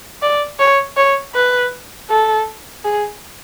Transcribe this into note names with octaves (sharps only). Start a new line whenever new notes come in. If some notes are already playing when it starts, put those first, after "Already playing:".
D5
C#5
C#5
B4
A4
G#4